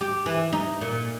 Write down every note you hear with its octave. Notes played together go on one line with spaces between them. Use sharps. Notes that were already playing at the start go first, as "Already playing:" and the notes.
G4
E3
D#4
A#2